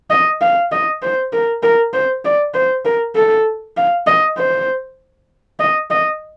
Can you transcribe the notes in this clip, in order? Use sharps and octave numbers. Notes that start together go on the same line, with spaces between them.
D#5
F5
D#5
C5
A#4
A#4
C5
D5
C5
A#4
A4
F5
D#5
C5
D#5
D#5